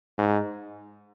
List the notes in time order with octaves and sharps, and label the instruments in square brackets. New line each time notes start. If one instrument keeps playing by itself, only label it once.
[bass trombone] G#2